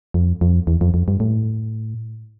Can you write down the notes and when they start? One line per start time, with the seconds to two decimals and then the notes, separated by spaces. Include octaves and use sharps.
0.14 F2
0.41 F2
0.67 E2
0.81 F2
0.94 F2
1.08 G2
1.20 A2